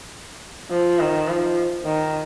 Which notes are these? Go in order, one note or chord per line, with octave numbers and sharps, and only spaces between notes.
F3
D#3
F3
D#3